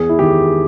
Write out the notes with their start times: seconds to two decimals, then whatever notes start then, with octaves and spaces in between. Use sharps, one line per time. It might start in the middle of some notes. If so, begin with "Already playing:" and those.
Already playing: E2 G#4
0.09 E4
0.19 D#3 G4